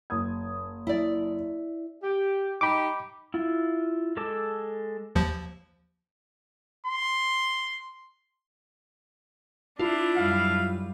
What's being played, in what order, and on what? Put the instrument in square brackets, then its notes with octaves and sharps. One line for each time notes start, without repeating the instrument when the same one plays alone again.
[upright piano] F#1 D#6 G#6
[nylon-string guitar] E4 D5
[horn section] G4
[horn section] D#4 G4 [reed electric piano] B5 D6
[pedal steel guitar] E4 F4
G#3 A4 D6 E6
[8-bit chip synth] D#2 F3
[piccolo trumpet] C6
[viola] D4 E4 [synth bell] F4
[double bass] F#2 G3 [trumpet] F5